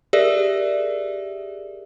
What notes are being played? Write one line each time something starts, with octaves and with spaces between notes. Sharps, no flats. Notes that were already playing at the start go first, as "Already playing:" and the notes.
G4 G#4 A#4 D5 E5